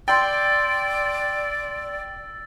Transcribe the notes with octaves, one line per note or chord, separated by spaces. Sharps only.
D5 G5 C6 E6 A6